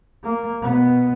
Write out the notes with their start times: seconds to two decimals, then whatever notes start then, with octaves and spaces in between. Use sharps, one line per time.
0.24 A#3
0.62 B2 B3